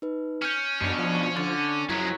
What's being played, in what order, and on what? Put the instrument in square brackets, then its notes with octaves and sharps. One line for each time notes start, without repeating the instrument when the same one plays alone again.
[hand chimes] D#4 B4
[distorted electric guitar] C#4 [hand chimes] F6 G6
[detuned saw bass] F#2 [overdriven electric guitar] B2 D4
[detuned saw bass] F3 [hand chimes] D5
[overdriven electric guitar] D3 [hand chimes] A6
[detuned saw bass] F#2 [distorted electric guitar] F3 G#3 [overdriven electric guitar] F#3 [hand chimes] E4 G#6 B6